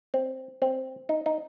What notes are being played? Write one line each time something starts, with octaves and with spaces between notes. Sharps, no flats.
C4
C4
D#4
D#4